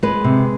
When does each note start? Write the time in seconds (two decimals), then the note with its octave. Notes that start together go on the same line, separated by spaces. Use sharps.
0.03 G#3 B4
0.24 C3